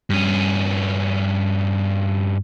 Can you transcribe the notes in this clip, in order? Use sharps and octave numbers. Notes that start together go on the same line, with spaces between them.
G2 C#4